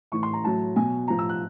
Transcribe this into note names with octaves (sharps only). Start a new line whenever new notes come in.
A2 E3 C#6
C6
A#5
A2 F#3 A5
B2 F#3 G#5
A2 F3 A#5
E6
F#6